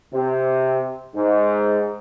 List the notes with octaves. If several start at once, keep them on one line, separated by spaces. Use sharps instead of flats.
C3
G#2